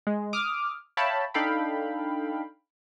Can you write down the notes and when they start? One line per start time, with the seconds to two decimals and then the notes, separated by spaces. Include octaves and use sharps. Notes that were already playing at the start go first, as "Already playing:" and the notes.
0.07 G#3
0.33 D6 D#6 F6
0.97 C#5 E5 F5 G5 A5 B5
1.34 D4 D#4 A4 F5 G5 B5